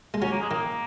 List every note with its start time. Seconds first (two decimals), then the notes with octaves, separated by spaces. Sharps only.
0.14 G#3
0.22 F#3 C#4
0.31 A#3
0.41 G#3
0.49 D#3 A#3